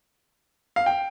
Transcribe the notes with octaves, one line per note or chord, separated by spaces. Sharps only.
F5
G5